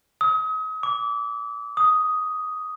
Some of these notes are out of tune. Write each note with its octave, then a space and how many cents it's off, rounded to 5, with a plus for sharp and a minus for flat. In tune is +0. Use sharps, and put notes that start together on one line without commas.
D#6 +35
D6 -25
D#6 +5